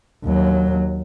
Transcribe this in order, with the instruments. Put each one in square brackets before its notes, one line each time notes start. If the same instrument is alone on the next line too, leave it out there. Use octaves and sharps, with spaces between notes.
[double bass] D#2 F#3